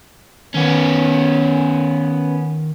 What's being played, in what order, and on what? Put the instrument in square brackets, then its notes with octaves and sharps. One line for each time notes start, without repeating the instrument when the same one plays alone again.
[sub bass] D#3 [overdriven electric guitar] B3 C#4